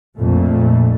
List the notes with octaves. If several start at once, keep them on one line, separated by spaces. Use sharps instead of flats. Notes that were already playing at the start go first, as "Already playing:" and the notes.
A#1 F2 A#2 A3